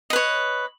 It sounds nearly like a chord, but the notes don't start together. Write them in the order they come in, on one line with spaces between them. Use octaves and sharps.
D#5 B4 C#5